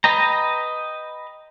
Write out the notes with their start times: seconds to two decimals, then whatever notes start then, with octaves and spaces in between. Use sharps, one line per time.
0.04 B4 D#5 G5 A#5